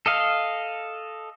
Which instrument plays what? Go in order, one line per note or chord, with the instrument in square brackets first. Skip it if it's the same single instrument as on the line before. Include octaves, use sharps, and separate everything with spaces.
[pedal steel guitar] A4 D#5 F5